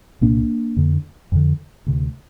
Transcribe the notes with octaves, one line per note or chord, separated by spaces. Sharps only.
C2 A#2 A#3 D4
F2 D3
F2 D3
D2 C3